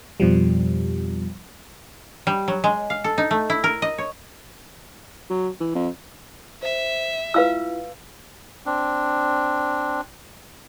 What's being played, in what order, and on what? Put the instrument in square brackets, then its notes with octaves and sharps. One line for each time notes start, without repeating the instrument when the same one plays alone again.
[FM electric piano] F2 B2 F3 G3
[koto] G3
F#3
G#3
F5
A4
D#4
A3
E4
A#4
D#5
C#5
[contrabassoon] F#3
E3
F2
[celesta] C5 [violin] E5
[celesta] E4 F4 [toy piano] B4 F5 E6
[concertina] C4 D4